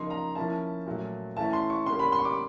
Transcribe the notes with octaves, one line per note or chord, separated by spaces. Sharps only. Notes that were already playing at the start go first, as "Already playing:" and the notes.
Already playing: C#3 F3 A#3 D#4 C6
A#5
F3 A#3 C#4 E4 A5
A#2 F#3 A3
E3 A3 C#4 E4 A5
C6
C#6
D3 G3 A#3 C#4 C6
B5
C6
C#6
D6